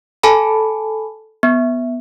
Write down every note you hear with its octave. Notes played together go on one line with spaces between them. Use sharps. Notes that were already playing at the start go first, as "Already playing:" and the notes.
A4 G#5 A5 B5
B3